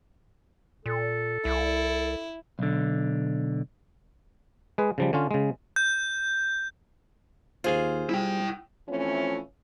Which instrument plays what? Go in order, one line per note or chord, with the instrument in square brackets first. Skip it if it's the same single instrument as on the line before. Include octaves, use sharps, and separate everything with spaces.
[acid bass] A#2 [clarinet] A4
[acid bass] C2 [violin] E4
[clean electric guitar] B1 D3
[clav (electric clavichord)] G#3 G#4 B4
C#3 F3 G3
D3 C#4 F4
C#3 G#3
[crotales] G6
[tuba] D#2 [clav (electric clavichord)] F4 G#4 F5 [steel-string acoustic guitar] C5
[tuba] G3 [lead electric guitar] E4 G5
[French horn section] E3 F3 A3 C4 C#4